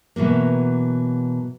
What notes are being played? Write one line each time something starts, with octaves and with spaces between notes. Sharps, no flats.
B2 E3 F#3 A#3